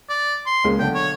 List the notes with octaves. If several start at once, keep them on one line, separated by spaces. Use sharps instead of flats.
D5
C6
C#2 G#3 A#3
B1 D3 G5 A5
C#5